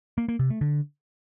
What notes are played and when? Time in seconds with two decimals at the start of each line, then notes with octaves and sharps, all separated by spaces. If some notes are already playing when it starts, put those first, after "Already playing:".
0.18 A#3
0.29 A#3
0.39 C3
0.50 A3
0.61 D3